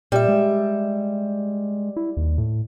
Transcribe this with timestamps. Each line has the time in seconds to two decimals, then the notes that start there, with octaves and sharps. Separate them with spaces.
0.12 A#2 G3 E5
0.28 G#3
1.97 E4
2.17 D#2
2.38 A2